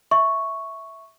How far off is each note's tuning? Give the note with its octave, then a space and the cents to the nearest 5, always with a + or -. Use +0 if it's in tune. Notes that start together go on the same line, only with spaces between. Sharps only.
E5 -5 C#6 +0